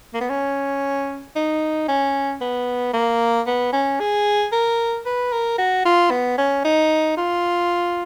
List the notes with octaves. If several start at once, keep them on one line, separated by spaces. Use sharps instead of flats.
A#3
B3
C#4
D#4
C#4
B3
A#3
B3
C#4
G#4
A#4
B4
A#4
F#4
F4
B3
C#4
D#4
F4